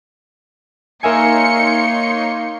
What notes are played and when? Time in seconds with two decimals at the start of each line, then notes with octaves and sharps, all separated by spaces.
1.03 A#3 D#4 A#4 C#5 E5 G#5 C6 C#7